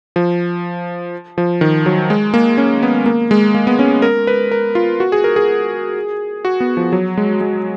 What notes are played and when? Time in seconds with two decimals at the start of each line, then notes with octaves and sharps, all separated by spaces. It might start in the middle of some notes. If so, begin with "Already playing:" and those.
0.16 F3
1.38 F3
1.61 D#3
1.86 F#3
2.10 G#3
2.34 A#3
2.58 C#4
2.83 B3
3.06 A#3
3.31 G#3
3.55 A#3
3.67 B3
3.79 C#4
4.02 A#4
4.27 B4
4.51 A#4
4.75 F4
5.00 F#4
5.12 G#4
5.24 A#4
5.36 G#4
6.45 F#4
6.60 B3
6.77 F3
6.93 F#3
7.17 G#3
7.41 G#3